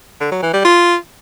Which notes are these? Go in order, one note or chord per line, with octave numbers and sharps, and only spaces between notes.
D3
F#3
E3
G3
F4